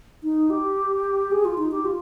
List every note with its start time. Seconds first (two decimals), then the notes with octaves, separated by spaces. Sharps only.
0.23 D#4
0.50 G4
1.31 G#4
1.45 F4
1.58 D#4
1.72 G4
1.85 F4